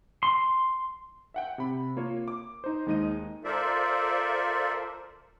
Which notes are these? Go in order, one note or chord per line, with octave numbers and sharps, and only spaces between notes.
C6
E5 F#5 G5
C3 B5
A#3 F4 C#5
D6
D#4 C5
D#2 G#3 D#4 D#5 D#7
F4 A4 A#4 C5 D5 E5